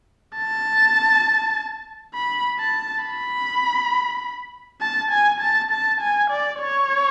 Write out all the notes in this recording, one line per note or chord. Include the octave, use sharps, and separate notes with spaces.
A5
B5
A5
B5
A5
G#5
A5
A5
G#5
D5
C#5